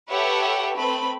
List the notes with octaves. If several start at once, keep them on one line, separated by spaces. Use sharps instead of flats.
G4 A4 B4 C#5 E5 F#5
A3 C4 B4 B5